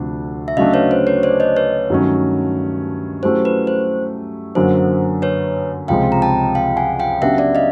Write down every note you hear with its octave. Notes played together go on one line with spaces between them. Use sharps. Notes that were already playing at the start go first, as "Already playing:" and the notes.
Already playing: D2 C3 F3 A3 D4
E5
C#3 F#3 A3 D4 D#5 F5
B4 C#5
C5
B4 C#5
C5 D5
C#5 D#5
B4 C#5
G2 D#3 F#3 A3 C#4
F#3 A3 C#4 E4 G4 C5
B4
C5
F#2 D3 F#3 A#3 C5
B4 C#5
C#2 C3 F3 G#3 C4 F5 G5
A#5
G5 A5
F5 G5
F#5 G#5
F5 G5
C#3 F#3 B3 D4 G4 E5 F#5
D5 E5
D#5 F5